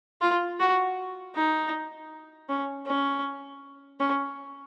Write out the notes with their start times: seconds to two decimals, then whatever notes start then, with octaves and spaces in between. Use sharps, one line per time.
0.21 F4
0.60 F#4
1.36 D#4
2.49 C#4
2.87 C#4
4.00 C#4